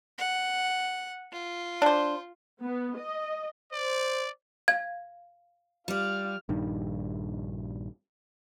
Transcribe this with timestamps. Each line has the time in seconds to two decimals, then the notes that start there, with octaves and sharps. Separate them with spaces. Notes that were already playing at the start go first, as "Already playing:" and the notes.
0.18 F#5
1.32 F4
1.82 D4 C5
2.62 B3
2.97 D#5
3.72 C5 D5
4.68 F5 G#6
5.88 G3 F4 D5 F6
6.49 A#1 G2 D#3